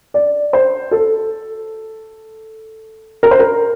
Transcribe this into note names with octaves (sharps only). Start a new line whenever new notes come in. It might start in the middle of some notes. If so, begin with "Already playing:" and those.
D5
C5
A4
A#4
C5
A#4